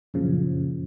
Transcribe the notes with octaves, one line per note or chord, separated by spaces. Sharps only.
F#2 A#2 C#3 F3